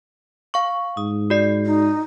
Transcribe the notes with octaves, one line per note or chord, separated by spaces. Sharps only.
F5 C#6
G#2 D#6
F#4 D5 C7
D#4